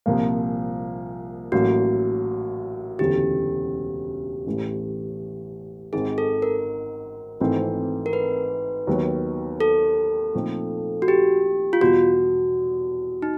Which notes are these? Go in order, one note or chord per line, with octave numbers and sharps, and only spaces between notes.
C2 A#2 F3 A#3
A1 A2 F#3 A#3 F#4
E1 D2 C#3 E3 A3 G4
A1 A2 E3 A3
G#1 G#2 D#3 G#4
A4
A#4
G#1 G#2 E3 A3 C4
A#4
B4
D#2 D#3 F#3 B3
A4
A#2 F3 A3 C4 D#4
F#4
G4
F4
E2 B2 G3 F#4
D#4